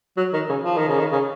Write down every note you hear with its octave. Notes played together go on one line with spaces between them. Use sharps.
F#3
D#3
C#3
F3
D#3
C#3
D#3
C#3